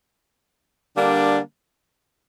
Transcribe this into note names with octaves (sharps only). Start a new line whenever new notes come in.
D3 G3 A#3 D4